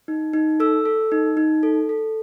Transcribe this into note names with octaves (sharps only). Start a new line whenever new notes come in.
D#4
D#4
A4 E6
A4
D#4
D#4
A4
A4